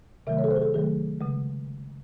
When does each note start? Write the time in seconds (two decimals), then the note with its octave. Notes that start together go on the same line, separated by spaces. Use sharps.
0.27 C3 D#3 F#3 A3 E5
0.38 C#5
0.44 A4
0.51 C5
0.56 G#4
0.62 A4
0.74 D#3 F#3 A3 G#4
1.21 C#3 G#3